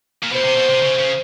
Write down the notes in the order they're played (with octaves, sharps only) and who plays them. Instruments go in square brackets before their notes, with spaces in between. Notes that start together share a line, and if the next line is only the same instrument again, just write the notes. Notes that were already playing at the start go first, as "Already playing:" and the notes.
[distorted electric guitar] A#2
[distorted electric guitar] B2 [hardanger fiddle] C5
[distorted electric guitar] C3
B2
C3
C#3
C#3